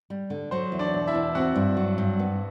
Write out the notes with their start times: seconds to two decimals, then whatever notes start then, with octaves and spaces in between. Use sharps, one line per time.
0.10 G3
0.30 D3
0.51 F#3 C5
0.72 E2
0.79 D4 D5
0.94 B2
1.07 E4 E5
1.15 E2
1.35 C4 F#4 F#5
1.56 G2
1.77 F#3
1.98 G2
2.19 B3